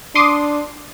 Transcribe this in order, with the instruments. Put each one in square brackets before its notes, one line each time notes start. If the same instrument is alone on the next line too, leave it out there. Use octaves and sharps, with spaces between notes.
[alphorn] D4 [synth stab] C6 D6 D#6